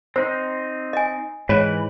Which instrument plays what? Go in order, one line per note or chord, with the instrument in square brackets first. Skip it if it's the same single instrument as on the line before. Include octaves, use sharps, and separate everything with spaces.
[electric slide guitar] C4 D#4 [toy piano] C5
[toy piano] D#5 G#5
[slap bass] G#2 [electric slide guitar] E3 B4 [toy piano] C#5